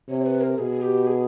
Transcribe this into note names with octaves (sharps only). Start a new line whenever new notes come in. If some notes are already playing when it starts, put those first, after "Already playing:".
C3 C#5
C5
B4
A#4
B2 G#4
G4
G#4